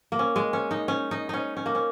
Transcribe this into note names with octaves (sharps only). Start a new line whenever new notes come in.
A#3
C#4
G#3
C#4
D#4
C#4
D#4
C#4 D#4
C#4
A#3
C#4